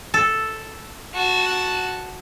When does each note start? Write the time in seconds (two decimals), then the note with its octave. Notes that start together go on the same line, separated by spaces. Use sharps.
0.14 A4
1.14 F#4 A5